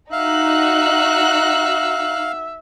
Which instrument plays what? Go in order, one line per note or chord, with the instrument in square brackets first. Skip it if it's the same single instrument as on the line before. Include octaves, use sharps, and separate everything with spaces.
[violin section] D#4 F#4 F#6 [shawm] E5 [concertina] F5